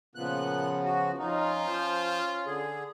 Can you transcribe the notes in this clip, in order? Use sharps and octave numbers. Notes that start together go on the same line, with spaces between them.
A#2 C#3 F3 B3 F#6
F#4
F2 C#4 D#4 F4
F3 C5
D3 G#4